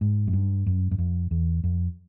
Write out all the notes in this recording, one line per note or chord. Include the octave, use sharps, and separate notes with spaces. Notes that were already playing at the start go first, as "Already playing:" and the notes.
G#2
F#2
G2
F#2
F#2
F2
E2
F2